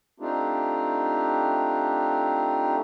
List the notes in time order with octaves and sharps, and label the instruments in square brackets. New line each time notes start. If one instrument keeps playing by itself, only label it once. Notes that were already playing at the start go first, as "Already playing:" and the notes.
[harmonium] A3 C4 D4 D#4 F4 G4